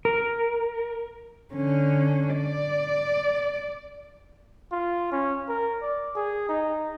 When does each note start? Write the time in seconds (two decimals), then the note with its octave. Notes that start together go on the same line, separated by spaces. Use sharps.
0.05 A#4
1.54 D3 C#4
2.37 D5
4.72 F4
5.12 C#4
5.48 A#4
5.82 D5
6.15 G#4
6.49 D#4